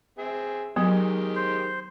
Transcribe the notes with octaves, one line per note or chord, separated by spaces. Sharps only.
C4 G#4 E5
D#3 F#3 G#3 B3 G4
C5